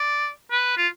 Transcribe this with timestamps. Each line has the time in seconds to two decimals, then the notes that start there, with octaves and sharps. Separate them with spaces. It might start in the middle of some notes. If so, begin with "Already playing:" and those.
Already playing: D5
0.51 B4
0.77 F4